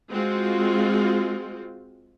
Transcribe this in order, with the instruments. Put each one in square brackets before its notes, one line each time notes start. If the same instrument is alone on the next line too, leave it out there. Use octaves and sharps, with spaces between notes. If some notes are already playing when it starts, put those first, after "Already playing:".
[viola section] G#3 C4 F4 F#4